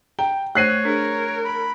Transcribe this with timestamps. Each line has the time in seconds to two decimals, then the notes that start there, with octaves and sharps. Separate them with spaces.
0.19 G5 A#5
0.55 A3 C5 C#5 F#6 C7 D#7
0.85 D4 G#4 A#4
1.44 B5